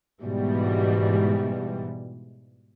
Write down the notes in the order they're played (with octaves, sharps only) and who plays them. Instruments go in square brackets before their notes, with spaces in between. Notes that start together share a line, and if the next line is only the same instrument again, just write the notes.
[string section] G#2 B2 E3 G3